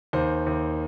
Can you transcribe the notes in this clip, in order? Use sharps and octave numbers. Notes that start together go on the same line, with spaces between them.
D#2 C5
D#2